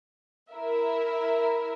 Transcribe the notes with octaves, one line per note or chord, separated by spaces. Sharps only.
E4 A#4 E5